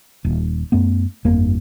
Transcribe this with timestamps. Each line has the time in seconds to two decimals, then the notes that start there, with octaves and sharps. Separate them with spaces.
0.25 D#1
0.72 F#2 A3 B3
1.25 G1 F2 A#3